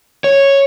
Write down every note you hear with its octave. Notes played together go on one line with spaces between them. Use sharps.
C#5